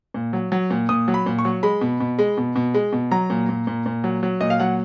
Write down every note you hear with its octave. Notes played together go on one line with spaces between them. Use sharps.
A#2
F#3
F#3
A#2
A#2 D#6
F#3
B5
A#2
C#6
F#3
G#3 B5
B2
B2
G#3
B2
B2
G#3
B2
F#3 A#5
A#2
A#2
A#2
A#2
F#3
F#3
A#2 D#5
F5
F#3 F#5